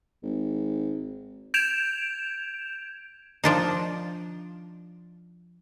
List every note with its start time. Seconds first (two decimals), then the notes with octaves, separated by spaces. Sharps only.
0.23 G#1
1.54 G6 G#6 D7 E7 F7
3.44 F3 D4 D#4